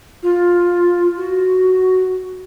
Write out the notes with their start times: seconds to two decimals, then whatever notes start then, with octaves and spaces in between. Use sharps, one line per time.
0.23 F4
1.17 F#4